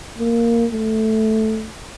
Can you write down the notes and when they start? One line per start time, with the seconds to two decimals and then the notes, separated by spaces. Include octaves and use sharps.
0.18 A#3
0.72 A3